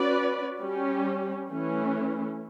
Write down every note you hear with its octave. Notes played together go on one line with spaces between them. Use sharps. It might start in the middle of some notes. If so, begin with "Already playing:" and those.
Already playing: C#4 F#4 B4 D5
G3 C#4 G4
E3 A3 C#4